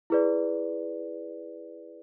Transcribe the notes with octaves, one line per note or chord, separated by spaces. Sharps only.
E4 G#4 B4 D5